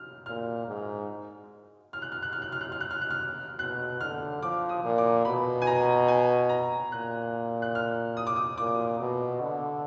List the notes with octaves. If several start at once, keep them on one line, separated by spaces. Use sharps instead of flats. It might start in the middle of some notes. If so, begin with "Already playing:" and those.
Already playing: F6
A#2 F6
G#2
F6
F#6
F6
F#6
F6
F#6
F6
F#6
F6
F#6
F6
F#6
F6
B2 F#6
D3 F6
F3 D6
D#6
A#2
D6
B2 B5
G#5
A#5
G#5
A#5
A#2 F#6
F#6
F6
D#6
D6
D#6
A#2 D6
B2
D3